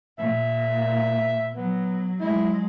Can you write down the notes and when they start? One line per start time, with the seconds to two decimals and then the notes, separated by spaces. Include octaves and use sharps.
0.19 A#2 E5
1.54 F#3 B3
2.20 F#3 G#3 E4